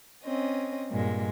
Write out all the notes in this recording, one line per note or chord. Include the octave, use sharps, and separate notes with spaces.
C4 C#4 D#5
G2 A#2 G#3